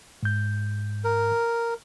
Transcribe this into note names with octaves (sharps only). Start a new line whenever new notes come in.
G#2 G6
A#4